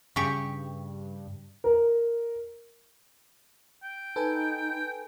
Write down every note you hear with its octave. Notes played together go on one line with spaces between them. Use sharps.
G2 C#3 G4 C#6
A#4
G5
D#4 A4 B4 G#5